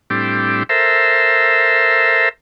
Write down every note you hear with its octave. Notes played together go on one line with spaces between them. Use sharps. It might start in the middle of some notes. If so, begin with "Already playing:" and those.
A2 G3 C4 D4 E4 G4
A4 A#4 C5 E5